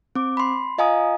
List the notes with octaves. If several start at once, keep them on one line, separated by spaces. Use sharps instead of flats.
C4 D6
B5 C6
F4 D#5 F5 G#5 A#5 D#6